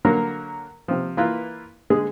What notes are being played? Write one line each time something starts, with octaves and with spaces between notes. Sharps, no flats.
D3 F#3 A#3 A#4
C3 F3
E3 A#3 E4 F4 B4
D3 G#3 G#4